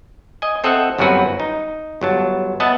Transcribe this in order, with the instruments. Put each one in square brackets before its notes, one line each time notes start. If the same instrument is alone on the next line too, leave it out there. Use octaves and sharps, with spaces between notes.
[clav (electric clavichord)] D#5 G#5
C4 A4 D#5 E5 F#5
G1 F#2 F#3 C4 F#4 B4
D#4
G1 F#3 A5
B3 D#5 E5 F#5 A5